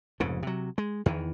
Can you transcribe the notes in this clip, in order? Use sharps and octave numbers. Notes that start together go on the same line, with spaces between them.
F1 F2 G#2 C#3
C3 F#3
G#3
E2 D#3 E3